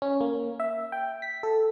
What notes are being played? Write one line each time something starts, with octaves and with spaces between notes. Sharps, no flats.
C#4
A#3
E5
G5
B6
A4